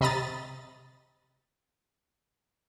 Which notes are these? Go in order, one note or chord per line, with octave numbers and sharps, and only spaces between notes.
C3 D#5 A#5 B5 D#6 A6